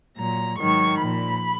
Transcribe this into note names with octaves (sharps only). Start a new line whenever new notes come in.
A#2 F#3 A#5
G#2 D#3 F#3 C#6
A#2 F3 B5